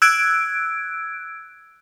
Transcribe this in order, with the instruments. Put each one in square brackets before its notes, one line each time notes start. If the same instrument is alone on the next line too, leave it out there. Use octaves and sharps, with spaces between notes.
[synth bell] E6 F#6 G#6 D7